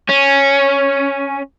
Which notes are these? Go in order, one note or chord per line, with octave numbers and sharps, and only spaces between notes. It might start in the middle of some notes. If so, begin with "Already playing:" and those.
C#4